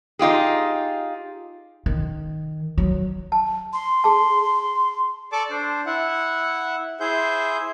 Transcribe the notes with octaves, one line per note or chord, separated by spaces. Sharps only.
D#4 F4 G4 G#4
D#3
F#3
A5
C6
G#4 A5
A4 D5 A5 C#6 D6
D4 C5
E4 F#5
E4 G#4 C5 G6